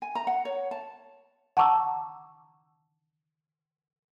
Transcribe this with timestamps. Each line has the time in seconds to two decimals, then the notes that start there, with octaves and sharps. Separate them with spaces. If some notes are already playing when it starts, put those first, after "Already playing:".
0.02 G#5
0.15 A#5
0.27 F#5
0.45 C#5
0.71 A5
1.57 F#5 A5 A#5 C#6 D6 E6